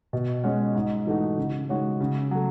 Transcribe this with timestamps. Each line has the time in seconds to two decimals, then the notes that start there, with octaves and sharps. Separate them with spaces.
0.13 B2
0.44 G#3 C#4 F#4 C#5
0.75 G#2
1.07 E3 A3 D#4 F#4
1.37 C#3
1.69 G#3 D#4 F#4 C#5
2.00 C#3
2.31 F#3 A3